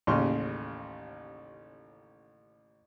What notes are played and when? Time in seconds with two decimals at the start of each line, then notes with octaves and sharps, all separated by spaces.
0.07 A1 D#2 C#3 C#4 C6 C#6